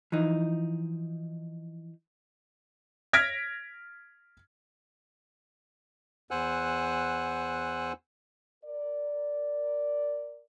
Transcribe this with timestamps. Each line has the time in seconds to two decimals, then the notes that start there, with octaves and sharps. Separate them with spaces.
0.12 E3 F3 D#4
3.13 F6 G#6 A#6 B6 D7
6.31 E2 C5 F#5 G#5 E6 F#6
8.64 A#4 D5